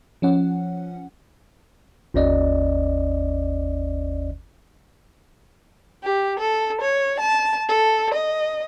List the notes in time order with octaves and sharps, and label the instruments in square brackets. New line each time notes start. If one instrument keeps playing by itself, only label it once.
[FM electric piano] F3 C#4 F#5
[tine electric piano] G1 D#2 C#4 D5 D#5
[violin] G4
A4
C#5
A5
A4
D#5